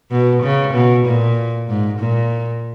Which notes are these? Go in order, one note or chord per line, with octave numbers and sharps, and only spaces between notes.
B2
C#3
B2
A#2
G#2
A#2